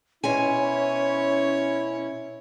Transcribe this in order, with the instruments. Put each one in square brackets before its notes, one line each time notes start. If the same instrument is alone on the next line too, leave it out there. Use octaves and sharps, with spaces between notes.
[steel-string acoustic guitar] B2 C5 G#5 [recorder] C#4 [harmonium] E4 [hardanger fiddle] C#5